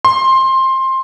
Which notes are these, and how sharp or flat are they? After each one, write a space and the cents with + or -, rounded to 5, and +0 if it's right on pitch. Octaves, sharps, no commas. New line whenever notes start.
C6 +15